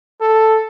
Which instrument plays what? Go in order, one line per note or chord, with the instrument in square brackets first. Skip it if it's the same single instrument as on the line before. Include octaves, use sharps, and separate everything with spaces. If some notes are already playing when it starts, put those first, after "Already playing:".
[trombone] A4